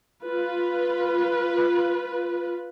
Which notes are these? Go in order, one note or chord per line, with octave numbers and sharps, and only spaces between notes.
F4 B4